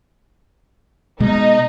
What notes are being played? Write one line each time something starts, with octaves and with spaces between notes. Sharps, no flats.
B2 G#3 D#4